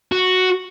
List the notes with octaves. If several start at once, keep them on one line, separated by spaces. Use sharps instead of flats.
F#4